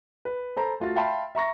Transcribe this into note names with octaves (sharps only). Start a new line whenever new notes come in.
B4
A4 C5 A#5 B5
A3 F4 F#4 A6
E5 F5 G5 A5 B5 C6
E5 A#5 C#6 A#6